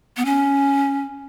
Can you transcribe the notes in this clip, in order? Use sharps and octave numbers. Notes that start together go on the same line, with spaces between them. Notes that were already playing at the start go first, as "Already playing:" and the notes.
B3
C#4